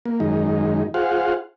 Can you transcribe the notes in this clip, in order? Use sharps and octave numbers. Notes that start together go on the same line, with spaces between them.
A#3
F#2 D#3 G#3 D#4
F4 G#4 C5 F5 F#5